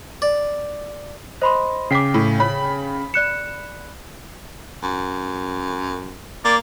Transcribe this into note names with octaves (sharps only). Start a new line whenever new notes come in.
D5
C5 D#5 B5 C6
C#3 G5 D6 B6 C7
A2
C#5 B5
D5 F#6 C#7 E7
F#2
A#3 D5